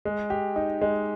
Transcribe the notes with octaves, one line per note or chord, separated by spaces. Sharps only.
G#3
G4
D#4
G#3